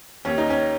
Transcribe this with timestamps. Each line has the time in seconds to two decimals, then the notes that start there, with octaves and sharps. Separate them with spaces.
0.25 D#2 C#4
0.38 D#4
0.50 C#4